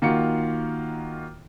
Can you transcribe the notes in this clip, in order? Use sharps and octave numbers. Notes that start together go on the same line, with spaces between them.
D#3 A#3 F4 F#4 C#7